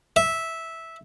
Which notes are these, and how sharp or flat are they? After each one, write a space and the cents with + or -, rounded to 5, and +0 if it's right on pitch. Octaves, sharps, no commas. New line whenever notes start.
E5 -10